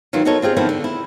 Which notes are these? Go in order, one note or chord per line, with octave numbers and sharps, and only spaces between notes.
D#3 E3 F#3 F4
B3 D#4 F#4 A4 A#4 C#5
C4 F4 G4 G#4
D3 D#3 F3 B3 C4 E4
D3
E4